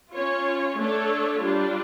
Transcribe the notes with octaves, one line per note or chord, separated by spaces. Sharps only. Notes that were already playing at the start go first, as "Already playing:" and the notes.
C#4 F4 C#5
A3 D4 A4 C#5
G3 D4 F4